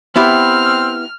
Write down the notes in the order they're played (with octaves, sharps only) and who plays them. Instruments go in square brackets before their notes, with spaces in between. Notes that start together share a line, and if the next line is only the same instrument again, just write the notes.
[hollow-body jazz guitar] B3 E4 G4 [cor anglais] C4 [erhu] F6